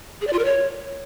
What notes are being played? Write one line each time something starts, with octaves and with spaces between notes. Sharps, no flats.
G#4
D5
F4
A#4
C#5